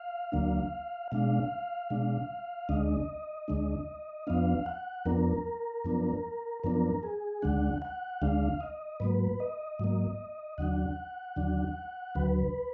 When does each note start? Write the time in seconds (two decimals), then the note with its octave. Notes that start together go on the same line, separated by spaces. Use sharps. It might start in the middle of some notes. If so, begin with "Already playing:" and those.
Already playing: F5
0.32 D2 D3 F#3 A#3 D4
1.12 B2 G#3 D4 F5
1.90 B2 G#3 D4
2.69 D2 D3 G#3 D4 D#5
3.48 D2 D3 G#3 D4
4.27 F2 F3 B3 D4 F5
4.66 F#5
5.05 F2 F3 B3 D4 A#4
5.85 F#2 F3 B3 D4
6.64 F#2 F3 B3 D4 A#4
7.03 G#4
7.42 D2 D3 G#3 D4 F#5
7.82 F#5
8.22 D2 D3 G#3 D4 F5
8.60 D#5
9.00 G#2 F#3 A#3 B4
9.40 D#5
9.79 G#2 F#3 A#3
10.58 D#2 D3 F#3 D4 F#5
11.36 D#2 D3 F#3 D4
12.15 D2 D3 F#3 B4